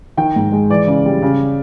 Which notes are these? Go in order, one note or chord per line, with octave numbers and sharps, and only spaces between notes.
D#3 G5
G#2
G#3
E3 D5
C#3
G3
C#3